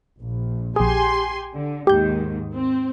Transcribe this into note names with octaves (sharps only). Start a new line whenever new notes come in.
A#1
A#1 G4 G#4 G#5 C6
D3
D#2 G#2 D#3 G4 G6
C4